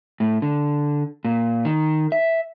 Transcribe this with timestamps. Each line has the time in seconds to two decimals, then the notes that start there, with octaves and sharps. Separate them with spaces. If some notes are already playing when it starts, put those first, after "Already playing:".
0.20 A2
0.42 D3
1.25 A#2
1.65 D#3
2.12 E5